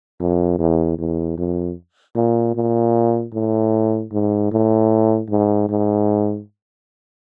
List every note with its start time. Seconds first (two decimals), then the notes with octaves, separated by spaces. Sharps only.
0.20 F2
0.59 E2
0.98 E2
1.38 F2
2.16 A#2
2.55 A#2
3.33 A2
4.12 G#2
4.51 A2
5.30 G#2
5.69 G#2